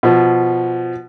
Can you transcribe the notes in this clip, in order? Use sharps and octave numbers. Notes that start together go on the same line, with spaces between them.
B2 F3